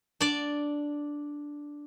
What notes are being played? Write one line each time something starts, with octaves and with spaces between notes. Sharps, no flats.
D4 D5